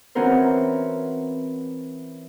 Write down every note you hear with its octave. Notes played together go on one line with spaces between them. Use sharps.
E3 C4 C#4 F#4 A#4 C5